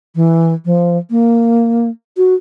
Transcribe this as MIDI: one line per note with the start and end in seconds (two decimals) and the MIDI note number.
0.15 0.53 52
0.65 0.97 53
1.10 1.89 58
2.17 2.34 66